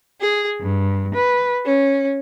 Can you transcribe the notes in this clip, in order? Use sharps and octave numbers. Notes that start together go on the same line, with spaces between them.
G#4
G2
B4
C#4